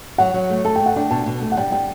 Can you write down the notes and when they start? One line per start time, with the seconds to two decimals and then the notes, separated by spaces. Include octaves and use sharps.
0.18 F#3 F#5
0.34 F#3
0.50 A3
0.65 A4 A5
0.76 A3 G5
0.86 F#5
0.96 D4 G5
1.11 B2 A5
1.26 B2
1.42 A3
1.52 F#5
1.57 G3 G5
1.72 G3 G5